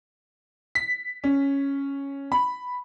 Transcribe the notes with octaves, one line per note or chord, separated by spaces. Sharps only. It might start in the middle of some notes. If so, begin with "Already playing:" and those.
B6
C#4
B5